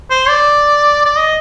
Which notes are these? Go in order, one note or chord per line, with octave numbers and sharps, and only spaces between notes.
C5
D5
D5
D#5